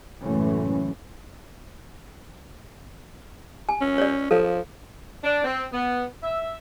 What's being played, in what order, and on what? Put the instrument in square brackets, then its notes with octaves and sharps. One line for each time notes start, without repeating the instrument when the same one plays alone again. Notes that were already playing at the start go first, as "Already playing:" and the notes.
[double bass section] F#1 F#2 A2 E3 A3 C#4
[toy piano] G#5
[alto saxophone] C#4
[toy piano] C#5 D5
[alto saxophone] F3 [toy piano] A4 F5
[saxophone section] D4
C4
B3
E5